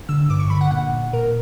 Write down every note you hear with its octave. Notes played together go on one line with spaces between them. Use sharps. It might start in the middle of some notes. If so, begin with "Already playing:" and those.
D3 E6
G2 D6
C#6
D3 B5
F#5
A#2 F#5
A#2 A#4